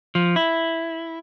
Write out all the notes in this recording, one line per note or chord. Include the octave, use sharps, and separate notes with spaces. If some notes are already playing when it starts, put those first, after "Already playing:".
F3
E4